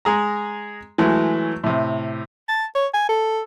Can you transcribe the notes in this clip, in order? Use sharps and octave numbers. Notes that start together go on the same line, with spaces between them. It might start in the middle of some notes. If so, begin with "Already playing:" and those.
G#3 G#4 A#5
E3 F#3 G#3 A3
A2 C3
A5
C#5
G#5
A4